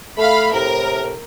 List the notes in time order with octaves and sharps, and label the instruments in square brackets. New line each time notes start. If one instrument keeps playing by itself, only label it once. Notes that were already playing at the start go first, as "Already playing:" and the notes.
[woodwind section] A3 [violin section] F5 B5
[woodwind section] A2 C3 [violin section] A#4